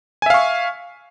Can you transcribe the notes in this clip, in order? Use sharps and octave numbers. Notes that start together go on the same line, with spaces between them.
E5 F5 G#5 C#6